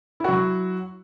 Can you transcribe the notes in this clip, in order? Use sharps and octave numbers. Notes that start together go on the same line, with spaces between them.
F#3 E4 F#4